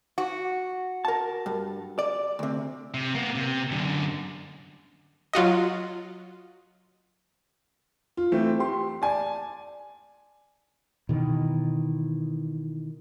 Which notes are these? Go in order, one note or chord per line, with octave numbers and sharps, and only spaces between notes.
F#4
A#4 A5
G2
D5
D2 C3
C3
A#3 B3
C3
F#2 D3
F#3 F4 F#4 D#5
F4
E3 A3 C4
G4 C6
D5 G#5 A5
B2 D#3 E3